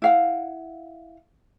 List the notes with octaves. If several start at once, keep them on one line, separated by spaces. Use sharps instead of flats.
E4 F5 F#5